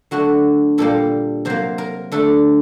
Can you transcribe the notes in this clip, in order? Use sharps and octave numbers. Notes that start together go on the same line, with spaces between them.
D3 F#3 A3 F#4
A#2 G3 A#3 A4
C3 F#3 A#3 C5
A#4
D3 A3 A4